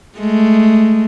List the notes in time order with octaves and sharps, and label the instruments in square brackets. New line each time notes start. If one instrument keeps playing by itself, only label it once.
[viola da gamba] G#3 A3